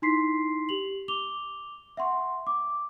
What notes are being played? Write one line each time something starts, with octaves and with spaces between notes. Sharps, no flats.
D#4 E4 C6 B6 C7
G4 F7 F#7
D6 F7 G7
E5 F#5 C6 C#6
D6